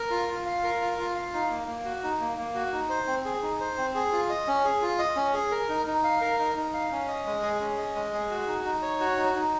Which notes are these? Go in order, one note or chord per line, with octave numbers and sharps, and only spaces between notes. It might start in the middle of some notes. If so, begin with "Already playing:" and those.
Already playing: A#4
F4
F4
F5
A#4
F4
F4
F5
D#4
A#3
A#3
F#4
D#4
A#3
A#3
F#4
D#4
C5
C4
G#4
D#4
C5
C4
G#4
F4
D#5
C#4
G#4
F4
D#5
C#4
G#4
A#4
D#4
D#4
F5
A#4
D#4
D#4
F5
C#4
D#5
G#3
G#4
C#4
D#5
G#3
G#4
F#4
D#4
D#4
C#5
F#4
D#4
D#4